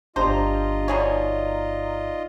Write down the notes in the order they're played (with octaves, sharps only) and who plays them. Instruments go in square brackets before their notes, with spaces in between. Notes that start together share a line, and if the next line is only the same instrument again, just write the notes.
[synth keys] G1 A#5 [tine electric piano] D4 G4 [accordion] F4 D#5 [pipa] C5
[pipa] B2 G#4 C#5 [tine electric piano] D#4 D5